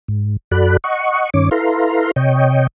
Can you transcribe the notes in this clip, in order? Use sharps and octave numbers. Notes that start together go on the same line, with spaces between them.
G#2
F#2 F#4 A4 D5 B5 F#6
D#5 F#5 C#6
G2 D#3 C#4 C#5 D6
E4 A4 B4 F5 A#5 C6
C3 C#5 D#5 G5